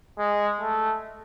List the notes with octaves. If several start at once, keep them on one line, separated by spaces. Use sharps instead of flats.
G#3
A3